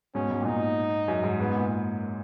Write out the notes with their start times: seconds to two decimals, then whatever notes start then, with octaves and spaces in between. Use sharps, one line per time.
0.15 G#2 B2 C#4
0.30 G#2
0.41 A#2
0.46 G#2 D#4
1.08 F#2
1.23 G#2
1.40 G#2 B3
1.55 A#2